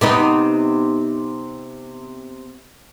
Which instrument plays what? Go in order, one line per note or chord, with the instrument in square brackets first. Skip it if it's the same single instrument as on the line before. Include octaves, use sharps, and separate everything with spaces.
[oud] C3 B3 D#4